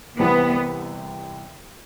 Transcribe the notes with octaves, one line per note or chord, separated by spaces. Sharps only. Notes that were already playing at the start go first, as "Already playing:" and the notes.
C2 C3 E3 B3